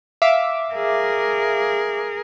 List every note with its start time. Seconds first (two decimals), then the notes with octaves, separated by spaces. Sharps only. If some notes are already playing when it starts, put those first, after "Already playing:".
0.22 E5 F5 D6
0.73 G#4 A#4